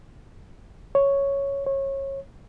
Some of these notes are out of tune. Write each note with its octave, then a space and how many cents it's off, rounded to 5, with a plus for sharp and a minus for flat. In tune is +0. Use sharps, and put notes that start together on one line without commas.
C#5 +0
C#5 -25